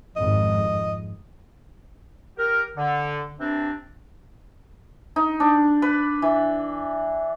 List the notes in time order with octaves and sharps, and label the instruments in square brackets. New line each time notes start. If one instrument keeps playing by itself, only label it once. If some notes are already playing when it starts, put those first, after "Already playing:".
[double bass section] G#1 F2 G#2 [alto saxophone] D#5
[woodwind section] G4 A#4
D3
C3 E3 C4 D4
[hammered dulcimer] D#4
D4
B4
E3